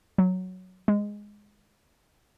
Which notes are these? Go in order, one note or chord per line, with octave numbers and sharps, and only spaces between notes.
F#3
G#3